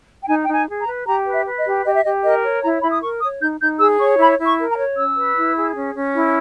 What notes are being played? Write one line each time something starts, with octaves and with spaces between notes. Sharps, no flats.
G5
D#4 G#5
D#4 G5
G#5
G#4
A#5
B4
G4 A#5
B4
E5
B4
D#5
G4
G4 D#5
E5
G4 D#5
A#4 D#5
C#5
E4 A#5
E4 B5
D#6
A#4 C#6
C#5 D#6
D#4 G6
D#4 G6
G#4 E6
C#5 C#6
E4 B5
E4
C#6
A#4
A#5
C#5
C#4 E6
B4
E4
G#4
C#4
C#4
E4